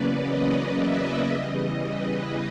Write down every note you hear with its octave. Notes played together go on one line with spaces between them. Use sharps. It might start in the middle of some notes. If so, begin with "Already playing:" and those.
Already playing: E2 C#3 F#3 A#3 C#4 B4 D5
D#5
E5
E2 C#3 E3 G3 D#5
B4